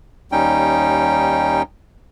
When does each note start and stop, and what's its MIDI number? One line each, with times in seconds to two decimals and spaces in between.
0.32 1.62 39
0.32 1.62 55
0.32 1.62 61
0.32 1.62 63
0.32 1.62 79